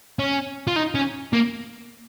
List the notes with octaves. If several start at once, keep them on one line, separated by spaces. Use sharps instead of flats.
C#4
F4
D#4
C#4
A#3